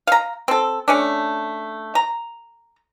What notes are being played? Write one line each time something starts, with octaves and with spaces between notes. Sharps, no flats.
F5 A#5
C4 A4
A3 C#4 D4
A#5